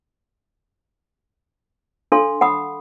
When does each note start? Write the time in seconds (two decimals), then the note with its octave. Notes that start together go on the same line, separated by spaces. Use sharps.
2.12 D4 A4 F5 C6
2.41 F#5 B5 D#6